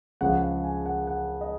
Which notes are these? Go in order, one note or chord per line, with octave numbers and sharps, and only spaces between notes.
C#2 C#3 F3 G#3 F#5
F#5
G#5
F#5
F#5
D#5